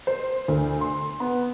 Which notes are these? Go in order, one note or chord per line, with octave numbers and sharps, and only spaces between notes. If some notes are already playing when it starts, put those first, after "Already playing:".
C5
D2
C6
B3